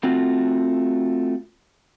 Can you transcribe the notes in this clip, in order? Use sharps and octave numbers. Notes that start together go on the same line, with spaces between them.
A3 C4 F4 F#4